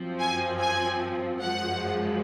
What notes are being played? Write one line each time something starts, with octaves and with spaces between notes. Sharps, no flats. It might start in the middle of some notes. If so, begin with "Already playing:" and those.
Already playing: F#2 F3 C4
G#5
G#5
F#2 F3 G#3 F#5